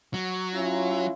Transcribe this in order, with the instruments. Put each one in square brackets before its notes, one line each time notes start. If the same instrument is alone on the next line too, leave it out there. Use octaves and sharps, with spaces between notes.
[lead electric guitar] F#3
[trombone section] C#4 E4 F4